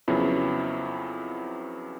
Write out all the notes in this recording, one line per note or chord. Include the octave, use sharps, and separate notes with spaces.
F2 C#3 F#3 B3 E4